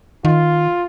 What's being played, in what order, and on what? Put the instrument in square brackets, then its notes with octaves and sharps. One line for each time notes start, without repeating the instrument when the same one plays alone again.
[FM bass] D#3 [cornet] F4